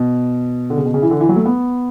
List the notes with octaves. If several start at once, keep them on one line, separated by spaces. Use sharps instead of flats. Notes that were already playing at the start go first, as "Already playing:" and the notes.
Already playing: B2
D3
C#3
B2
C#3
E3
D3
E3
F#3
A3
B3